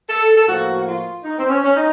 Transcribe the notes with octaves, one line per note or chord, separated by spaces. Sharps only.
A4
A4
A2 F3 A#3 F#4
F#4
F4
D#4
C4
C#4
C#4
D#4